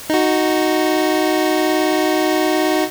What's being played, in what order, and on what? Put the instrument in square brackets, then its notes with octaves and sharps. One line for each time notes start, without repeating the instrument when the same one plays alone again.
[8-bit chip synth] D#4 F#4